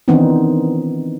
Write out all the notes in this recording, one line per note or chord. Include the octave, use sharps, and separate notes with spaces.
D#3 E3 B3 C4 D4 D#4